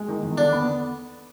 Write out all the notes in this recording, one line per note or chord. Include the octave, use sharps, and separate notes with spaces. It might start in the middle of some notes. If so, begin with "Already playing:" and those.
Already playing: G#3
D#3
E2
D3 D4
B3